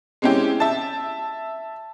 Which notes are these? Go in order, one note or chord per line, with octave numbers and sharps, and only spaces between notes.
G#3 C4 C#4 E4 G4
E5 A5